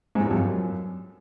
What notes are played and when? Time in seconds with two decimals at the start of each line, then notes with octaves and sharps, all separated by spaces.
0.15 G#2
0.20 A2
0.26 G2
0.31 F2
0.36 F#2